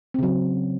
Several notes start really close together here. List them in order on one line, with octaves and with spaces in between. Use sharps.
C4 C#3 F#3